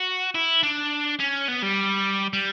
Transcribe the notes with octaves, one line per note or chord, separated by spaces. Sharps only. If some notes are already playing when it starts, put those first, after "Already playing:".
Already playing: F#4
E4
D4
C#4
B3
G3
G3